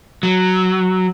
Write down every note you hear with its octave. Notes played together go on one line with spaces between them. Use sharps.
F#3